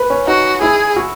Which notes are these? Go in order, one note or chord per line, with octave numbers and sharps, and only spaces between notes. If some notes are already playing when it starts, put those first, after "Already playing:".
Already playing: B4
C#4
D#4 F#4
E4 G#4
F#4